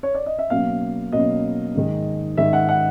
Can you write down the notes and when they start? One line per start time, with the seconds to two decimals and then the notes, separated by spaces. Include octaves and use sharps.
0.03 C#5
0.15 D5
0.26 D#5
0.39 E5
0.50 B2 F#3 A#3 C#4 F5
1.12 B2 F#3 A#3 C#4 D#5
1.75 G#2 D#3 G#3
2.37 G#2 D#3 G#3 E5
2.53 F#5
2.69 F#5